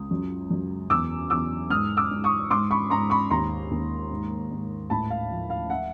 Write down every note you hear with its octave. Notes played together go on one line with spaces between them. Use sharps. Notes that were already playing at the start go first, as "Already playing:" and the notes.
Already playing: C#2 D#6
F#2
F#2
E2 D6 E6
E2 D6 E6
G#2 D#6 F6
D6 E6
G#2
C#6 D#6
G#2 C6 D6
B5 C#6
G#2 A#5 C6
B5 C#6
D#2 A#5 C6
D#2
G#2
G#2
A2 A5 B5
F5
F3
F5
E5 F#5